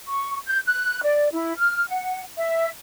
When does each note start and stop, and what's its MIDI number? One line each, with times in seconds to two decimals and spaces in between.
0.08 0.37 85
0.47 0.59 91
0.66 1.01 90
1.03 1.27 74
1.33 1.54 64
1.58 1.85 89
1.89 2.22 78
2.38 2.69 76